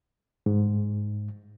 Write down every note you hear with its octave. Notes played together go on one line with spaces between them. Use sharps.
G#2